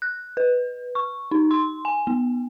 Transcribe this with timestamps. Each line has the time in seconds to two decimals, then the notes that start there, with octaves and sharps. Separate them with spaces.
0.02 F#6
0.37 B4
0.95 C#6
1.31 D#4
1.51 C6
1.85 G#5
2.07 B3